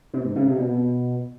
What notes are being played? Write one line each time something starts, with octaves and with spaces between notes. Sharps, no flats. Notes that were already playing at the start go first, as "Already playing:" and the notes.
C3
G#2
C#3
C3
B2